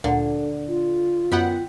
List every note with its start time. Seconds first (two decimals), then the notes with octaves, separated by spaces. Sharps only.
0.04 D2 A#2 D3
0.68 F4
1.32 F#2 B3 E5 F#5 G5